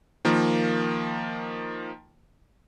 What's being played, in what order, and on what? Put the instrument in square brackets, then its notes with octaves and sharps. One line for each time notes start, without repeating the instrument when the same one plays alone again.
[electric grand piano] D#3 F3 A#3